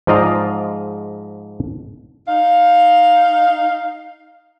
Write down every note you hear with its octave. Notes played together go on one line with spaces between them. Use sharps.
G#2 F3 D5 D#5 F5 A#5
D#4 F5